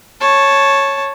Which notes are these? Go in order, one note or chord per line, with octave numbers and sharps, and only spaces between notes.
C#5 A5